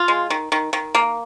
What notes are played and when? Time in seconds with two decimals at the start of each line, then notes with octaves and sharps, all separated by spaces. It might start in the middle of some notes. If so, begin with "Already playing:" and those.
Already playing: F4
0.08 G#3
0.30 D#3
0.52 D#3
0.73 D#3
0.95 A#3